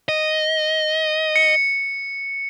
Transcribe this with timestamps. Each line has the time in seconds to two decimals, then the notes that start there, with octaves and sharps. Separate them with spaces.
0.09 D#5
1.36 C#7